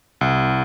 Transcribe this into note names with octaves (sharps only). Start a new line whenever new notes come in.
C2